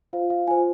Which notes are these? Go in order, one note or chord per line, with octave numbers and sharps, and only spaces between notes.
F4 C5 F5
F5
F4 C5 G#5